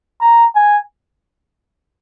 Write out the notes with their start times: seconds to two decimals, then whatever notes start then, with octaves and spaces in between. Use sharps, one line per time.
0.21 A#5
0.55 G#5